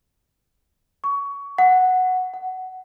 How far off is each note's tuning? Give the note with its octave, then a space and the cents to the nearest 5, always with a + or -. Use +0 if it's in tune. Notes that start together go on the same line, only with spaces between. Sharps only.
C#6 +20
F#5 -5
F#5 +10